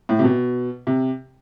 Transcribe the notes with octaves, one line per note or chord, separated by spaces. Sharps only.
A2
C3
B2
C3